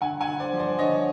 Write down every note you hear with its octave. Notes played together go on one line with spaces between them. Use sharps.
D3 F#5 G#5
F#5 G#5
D3
C5 D5
F3
C5 D5
D3 C#5 D#5